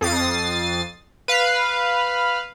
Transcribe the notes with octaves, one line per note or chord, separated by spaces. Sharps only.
F2 D#6 A6 C7
B4 F5